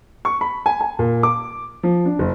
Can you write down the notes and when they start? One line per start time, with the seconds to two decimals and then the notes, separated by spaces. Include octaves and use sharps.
0.25 C#6
0.41 B5
0.66 G#5
0.81 G#5
0.99 A#2
1.23 D6
1.83 F3
2.06 D4
2.19 F#1